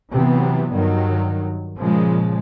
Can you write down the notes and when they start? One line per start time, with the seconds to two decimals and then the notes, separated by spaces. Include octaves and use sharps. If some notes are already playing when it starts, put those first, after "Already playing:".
0.12 C3 E3 F#3 B3
0.71 G2 D#3 F#3
1.78 A#2 C#3 F3 G#3